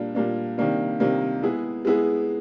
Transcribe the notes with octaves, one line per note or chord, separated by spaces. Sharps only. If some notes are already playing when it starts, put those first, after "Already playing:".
Already playing: A#2 G3 A#3 D4
A#2 G3 A#3 D4
C3 D#3 G3 A#3 D4
C3 D#3 G3 A#3 D4
G#3 B3 E4 G#4
G#3 B3 E4 G#4